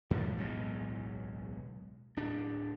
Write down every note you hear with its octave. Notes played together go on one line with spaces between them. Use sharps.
F2 A2 F3 G3
D1 B1 E2 G#3
D1 D4